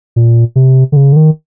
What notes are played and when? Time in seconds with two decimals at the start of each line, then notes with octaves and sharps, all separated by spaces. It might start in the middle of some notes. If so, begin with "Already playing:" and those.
0.16 A#2
0.56 C3
0.92 D3
0.96 C#3
1.13 D3
1.16 D#3